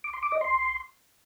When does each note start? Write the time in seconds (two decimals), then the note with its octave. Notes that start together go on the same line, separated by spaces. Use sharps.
0.04 D6
0.13 C6
0.23 D6
0.32 D#5
0.41 C6